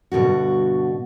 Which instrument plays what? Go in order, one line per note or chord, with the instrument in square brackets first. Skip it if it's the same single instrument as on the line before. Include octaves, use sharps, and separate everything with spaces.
[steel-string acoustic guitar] G2 B2 D3 F#4